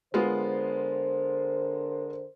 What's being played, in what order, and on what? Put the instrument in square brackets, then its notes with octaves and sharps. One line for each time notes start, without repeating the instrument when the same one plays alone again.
[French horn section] D3 A#4 C5 [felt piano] G#3 B3 F4